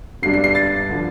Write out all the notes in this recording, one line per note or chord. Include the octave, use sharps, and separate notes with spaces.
G1 G2 G3 D4 C7
C7
C7
A6
D3 F3